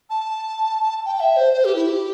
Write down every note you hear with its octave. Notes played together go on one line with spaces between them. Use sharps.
A5
G5
E5
C5
C5
G4
E4
G4